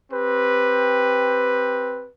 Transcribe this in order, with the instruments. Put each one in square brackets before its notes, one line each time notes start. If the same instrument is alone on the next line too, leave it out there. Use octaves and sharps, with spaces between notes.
[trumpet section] C4 G4 B4